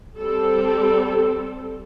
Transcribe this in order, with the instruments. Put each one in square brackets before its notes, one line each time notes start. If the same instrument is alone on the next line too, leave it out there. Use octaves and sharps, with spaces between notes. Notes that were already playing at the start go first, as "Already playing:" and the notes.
[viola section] G3 C4 A4